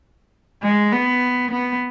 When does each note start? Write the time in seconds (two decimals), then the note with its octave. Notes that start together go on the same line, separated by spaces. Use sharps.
0.63 G#3
0.92 B3
1.51 B3